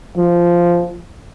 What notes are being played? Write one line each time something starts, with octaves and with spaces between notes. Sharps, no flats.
F3